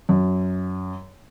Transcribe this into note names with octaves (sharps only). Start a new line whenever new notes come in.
F#2